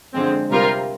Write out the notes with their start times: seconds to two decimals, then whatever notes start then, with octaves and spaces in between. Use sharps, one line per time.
0.14 F2 D3 F3 G#3 C4
0.50 C3 G3 C4 F4 A#4